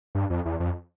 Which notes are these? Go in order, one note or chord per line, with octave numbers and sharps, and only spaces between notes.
G2
F2
E2
F2